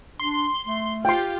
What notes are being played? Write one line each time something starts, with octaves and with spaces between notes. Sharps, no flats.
D4 C6
A3
F4 G4 G5 C6